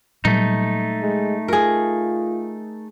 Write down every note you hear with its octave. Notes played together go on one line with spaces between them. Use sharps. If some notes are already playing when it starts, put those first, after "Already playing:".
A#2 F#3 G3 A3 D#4
G#3
F4 G#4 A#4